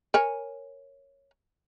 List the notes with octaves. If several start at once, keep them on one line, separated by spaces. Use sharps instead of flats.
A#4 C#5 G#5